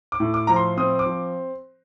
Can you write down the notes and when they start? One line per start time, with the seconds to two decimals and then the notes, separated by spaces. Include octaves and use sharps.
0.12 D6
0.20 A2
0.34 D6
0.47 F3 A#5
0.56 C6
0.77 C4 D#6
0.99 D6
1.06 F3